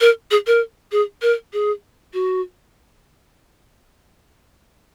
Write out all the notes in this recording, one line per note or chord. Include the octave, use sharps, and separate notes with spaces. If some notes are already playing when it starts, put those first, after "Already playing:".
A#4
G#4
A#4
G#4
A#4
G#4
F#4